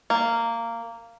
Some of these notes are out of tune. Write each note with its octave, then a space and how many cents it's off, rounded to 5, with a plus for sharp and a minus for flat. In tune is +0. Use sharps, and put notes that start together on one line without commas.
A#3 -15